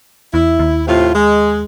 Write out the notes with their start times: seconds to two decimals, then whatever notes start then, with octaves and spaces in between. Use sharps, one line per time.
0.34 E2 E4
0.59 D#2
0.87 A2 C3 F4
1.15 G#3